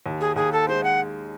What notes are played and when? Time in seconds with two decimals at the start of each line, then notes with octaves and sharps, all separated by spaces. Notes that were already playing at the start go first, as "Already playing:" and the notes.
0.06 D#2
0.21 G#4
0.36 D#2 G#4
0.52 A4
0.68 G#3 C5
0.84 F#5